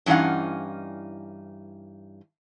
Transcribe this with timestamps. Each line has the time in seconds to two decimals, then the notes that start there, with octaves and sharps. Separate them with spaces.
0.06 G2 E3 C#4 D#4 F5 F#5